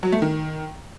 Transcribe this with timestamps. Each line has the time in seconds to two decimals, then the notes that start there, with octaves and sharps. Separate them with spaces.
0.03 F#3
0.12 A3
0.22 D#3